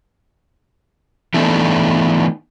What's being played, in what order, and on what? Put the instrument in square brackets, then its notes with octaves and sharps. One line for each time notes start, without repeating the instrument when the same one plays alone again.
[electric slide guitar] E3 A3 B3 D4 D#4